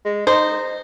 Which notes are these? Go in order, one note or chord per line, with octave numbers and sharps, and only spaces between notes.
G#3
D#4 C5